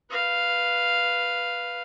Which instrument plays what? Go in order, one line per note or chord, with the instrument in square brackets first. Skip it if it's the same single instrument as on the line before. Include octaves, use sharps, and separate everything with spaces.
[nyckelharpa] B4 F5